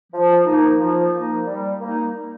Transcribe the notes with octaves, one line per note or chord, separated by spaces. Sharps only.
F3
A#3 D#4
F3
A#3 D#4
G3
A#3 D#4